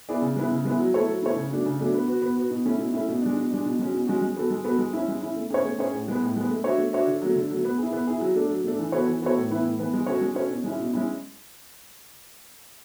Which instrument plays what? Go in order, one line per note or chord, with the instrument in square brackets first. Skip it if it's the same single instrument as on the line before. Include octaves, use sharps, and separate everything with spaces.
[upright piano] B3 E4 G#4 D5
C#3
G#3 B3 E4
C#3
G#3 B3 E4
F#3
A3 E4 A4 C#5
F#3
A3 E4 A4 C#5
C#3
F#3 A3 D4
C#3
F#3 A3 D4
B3
F#4 B4
B3
F#4 B4
B2
A3 C#4 E4
B2
A3 C#4 E4
B2
G#3 D4
B2
G#3 D4
B2
G#3 C#4 F#4
B2
G#3 C#4 F#4
G#3
B3 F#4 A4
G#3
B3 F#4 A4
G#3
C#4 E4
G#3
C#4 E4
A3
C#4 G#4 C#5
A3
C#4 G#4 C#5
A2
G#3 B3
A2
G#3 B3
A3
D4 F#4 C#5 E5
A3
D4 F#4 C#5 E5
D3
F#3 A3
D3
F#3 A3
B3
E4 G#4
B3
E4 G#4
F#3
A3 D4 A4
F#3
A3 D4 A4
E3
B3 F#4 A4 C#5
E3
B3 F#4 A4 C#5
A2
E3 B3 E4 B4
A2
E3 B3 E4 B4
G#3
C#4 F#4 A4 C#5
G#3
C#4 F#4 A4 C#5
B2
G#3 C#4 E4
B2
G#3 C#4 E4